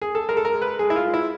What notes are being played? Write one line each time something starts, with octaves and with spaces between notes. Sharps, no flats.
G#4
A4
G#3 A#4
A4
A#4
G#3
B4
G#3 G#4
E4
F4
G#3
E4